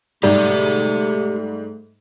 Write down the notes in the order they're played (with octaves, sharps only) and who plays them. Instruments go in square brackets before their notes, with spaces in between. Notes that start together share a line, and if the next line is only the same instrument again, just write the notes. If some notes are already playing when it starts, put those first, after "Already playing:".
[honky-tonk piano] G#2 G3 [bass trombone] A3 [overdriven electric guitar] G4 E5 [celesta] D5